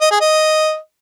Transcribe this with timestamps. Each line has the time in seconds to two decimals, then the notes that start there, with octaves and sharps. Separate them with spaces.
0.01 D#5
0.11 G#4
0.21 D#5